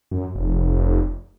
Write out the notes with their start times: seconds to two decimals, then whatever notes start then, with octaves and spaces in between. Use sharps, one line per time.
0.11 F#2
0.35 F1